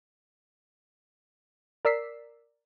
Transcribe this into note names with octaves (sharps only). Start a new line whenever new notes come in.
A#4 D5 E6 B6 C7